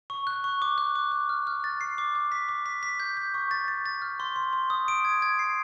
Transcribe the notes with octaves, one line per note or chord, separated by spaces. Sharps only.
C#6
F#6
C#6
D6
F#6
D6
D6
F6
F6
A6
C7
D6
D6
B6
D6
B6
B6
G6
G6
C#6
A6
A6
A6
F6
C6
C6
C6
D#6
D7
G#6
G#6
C7